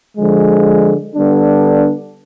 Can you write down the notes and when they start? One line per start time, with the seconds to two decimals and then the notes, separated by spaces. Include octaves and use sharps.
0.16 D3 F3 G#3
1.14 D3 G3 B3 D4